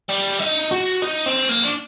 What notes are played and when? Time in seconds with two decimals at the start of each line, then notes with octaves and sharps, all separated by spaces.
0.09 G3
0.39 D#4
0.71 F#4
1.02 D#4
1.26 C4
1.49 A#3
1.64 D4